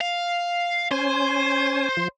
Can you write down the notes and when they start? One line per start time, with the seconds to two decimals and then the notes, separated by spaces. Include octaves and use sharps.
0.01 F5
0.91 C#4 C5 G#5
1.97 F3